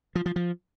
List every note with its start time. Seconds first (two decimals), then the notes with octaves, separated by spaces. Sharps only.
0.15 F3
0.26 F3
0.36 F3